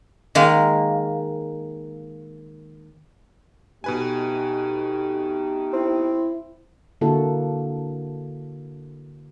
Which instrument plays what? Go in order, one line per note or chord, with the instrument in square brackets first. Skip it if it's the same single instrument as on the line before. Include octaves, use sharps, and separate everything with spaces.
[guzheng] D#3 G#3 A#3
[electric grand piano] B2 B4 G#5 [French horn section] A3 D#4 G4
[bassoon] C4 [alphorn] E4
[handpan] D3 A#3 E4 F#4 A4